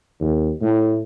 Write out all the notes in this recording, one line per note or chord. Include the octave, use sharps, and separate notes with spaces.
D#2
A2